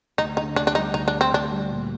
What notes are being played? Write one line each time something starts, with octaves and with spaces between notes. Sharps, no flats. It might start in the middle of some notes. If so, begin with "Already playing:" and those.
D2 D#4
D3 D#4
D2 D4
D4
G3 D#4
D2 D#4
D4
D3
C4
D2 D4
G3
A#2